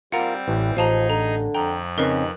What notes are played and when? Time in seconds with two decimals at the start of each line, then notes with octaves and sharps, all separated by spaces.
0.12 G3 C4 F4 A#4 F#5
0.48 A1 E3
0.77 A1 F3 D#4 G#4 D#5 F5 A5 A#5
1.10 D3 A#5
1.55 F2 G5 A#5 F#6
1.98 C#3 C4 C#4 D#4 A#4 B4